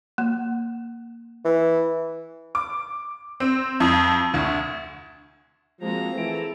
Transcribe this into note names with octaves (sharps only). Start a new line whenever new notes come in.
A#3
E3
D6
C4
F2
D2
F3 G#3 A#3 C4 F#4 A#5
E3 A3 E4 G#4 A4 D7